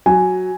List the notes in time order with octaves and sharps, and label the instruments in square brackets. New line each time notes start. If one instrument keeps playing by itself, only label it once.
[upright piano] F#3 [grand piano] G#5